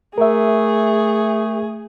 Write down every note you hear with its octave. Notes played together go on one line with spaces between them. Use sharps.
A3 G#4 A#4 E5